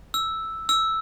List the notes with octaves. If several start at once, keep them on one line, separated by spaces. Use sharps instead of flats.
E6
E6